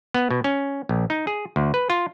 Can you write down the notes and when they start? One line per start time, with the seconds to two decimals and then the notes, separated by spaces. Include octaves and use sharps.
0.14 B3
0.31 B2
0.44 C#4
0.89 A#1
1.10 D#4
1.27 G#4
1.56 D2
1.74 B4
1.90 F4